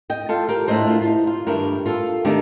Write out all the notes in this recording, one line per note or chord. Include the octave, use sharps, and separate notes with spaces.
D#5 G5
F4 A4
G4 A#4
A2 A3 D4 C5 D#5
F4
F4
D#4
F4
G2 D#3 A3 D4 G4 A#4
F4 A4
D#3 A3 D4 D#4 G4